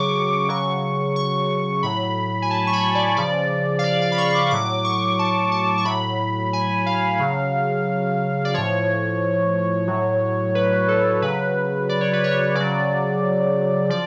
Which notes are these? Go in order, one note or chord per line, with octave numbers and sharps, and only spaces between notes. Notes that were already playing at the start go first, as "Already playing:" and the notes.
Already playing: C#3 F#3 C#6 D6
C#3 F#3 C#6
C#6
A2 F#3 B5
G#5
A5
C#6
B5
D5
C#3 F3 D5
F5
D5
F5
B5
C#6
C#6
D6
A2 F#3 D6
C#6
A5
A5
C#6
A2 F#3 B5
G#5
F5
C#3 F#3
D5
A2 F3 C#5
A2 F#3
B4
A4
C#3 F#3 B4
D5
C#5
B4
C#5
C#3 F#3 D5
F3 D5